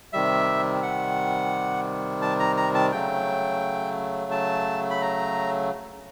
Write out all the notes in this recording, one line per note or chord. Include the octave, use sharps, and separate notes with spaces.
C3 D#3 G3 E5
F#5
A5
A#5
A#5
A5
C#3 F#3 A3 G5
A5
B5
A#5